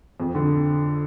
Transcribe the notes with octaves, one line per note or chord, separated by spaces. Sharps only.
F2
D3